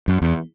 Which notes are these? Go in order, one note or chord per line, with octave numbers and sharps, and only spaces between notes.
F#2
E2